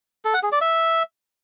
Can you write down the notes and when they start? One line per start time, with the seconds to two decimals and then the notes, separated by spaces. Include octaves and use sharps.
0.25 A4
0.34 F#5
0.43 G#4
0.52 D5
0.61 E5